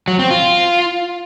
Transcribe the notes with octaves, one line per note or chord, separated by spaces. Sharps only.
F#3
C4
F4